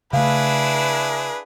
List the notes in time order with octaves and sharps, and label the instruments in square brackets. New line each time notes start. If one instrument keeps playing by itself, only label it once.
[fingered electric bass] C#3 A3 [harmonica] D4 E4 G#4 [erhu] B4 [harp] F5